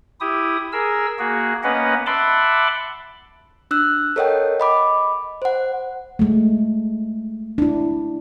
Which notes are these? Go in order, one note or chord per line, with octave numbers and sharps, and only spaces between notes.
E4 G4 D#6
G#4 A#4 E6
A#3 F#4 G#4
A#3 B3 C#4 B4 D#5 F#5
E5 F#5 A5 B5 C6 D6
D4 E6 F#6
A4 A#4 C#5 D#5 F#5 G5
D#5 B5 D6
C5 F#5
G#3 A3
D4 E4